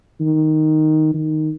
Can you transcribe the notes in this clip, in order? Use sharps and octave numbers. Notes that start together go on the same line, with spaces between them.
D#3
D#3